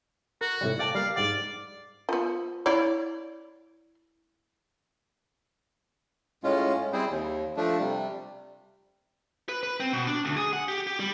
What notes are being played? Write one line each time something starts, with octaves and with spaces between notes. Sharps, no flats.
F#4 A#4
A2 C3 G3
D5 F5 G5 A5
G3 A#3 F5
G#2 G3 D5 F#5
F3 B3
E4 C#5 D5
A2 G#3 C#4 F4
G3 C4 E4 G#4 C5
D#2
F3 A3 D4
C3 G3
B4
B4
C4
B2
D4
D2
G#4
F#5
G4
G4
G3